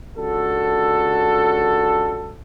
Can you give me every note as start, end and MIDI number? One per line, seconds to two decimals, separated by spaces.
0.17 2.35 37
0.17 2.35 62
0.17 2.35 66
0.17 2.35 69